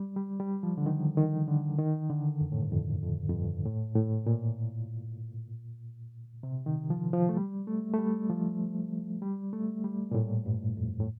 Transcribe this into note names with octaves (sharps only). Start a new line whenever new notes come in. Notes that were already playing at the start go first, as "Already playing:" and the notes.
Already playing: G3
G3
G3
F3
D3
D#3
D#3
D3
D#3
D3
F2
A2
G2
F2
F2
F2
G2
A2
A2
A#2
C3
D#3
F3
F3
A3
G3
A3
A3
G3
F3
G3
A3
G3
A#2
A2
G2
F2
A2